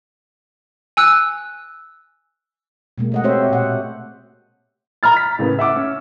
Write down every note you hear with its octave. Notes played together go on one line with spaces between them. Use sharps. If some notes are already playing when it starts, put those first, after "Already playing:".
G#5 E6 F#6
B2 G#3 A#3
A3 D#5 F#5
A3 C4 G4 C5 C#5 E5
A#2 F#5
A#5 B5 F6 A6
B6
A2 C#3 A#3 B3
E5 F#5 D6 E6
C#4